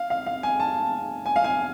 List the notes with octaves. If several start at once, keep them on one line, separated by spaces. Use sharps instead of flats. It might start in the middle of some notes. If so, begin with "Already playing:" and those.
Already playing: F5
F5
F5
G#5
A5
G#5
F5
G#5